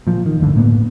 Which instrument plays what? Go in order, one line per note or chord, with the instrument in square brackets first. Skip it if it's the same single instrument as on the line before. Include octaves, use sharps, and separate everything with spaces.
[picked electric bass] A#2 F3
D#3
G1 D#2 A2 D3
A2 A#3 B3